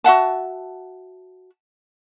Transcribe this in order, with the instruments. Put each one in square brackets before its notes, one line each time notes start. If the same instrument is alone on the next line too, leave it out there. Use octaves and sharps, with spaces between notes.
[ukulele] F#4 E5 F#5 A5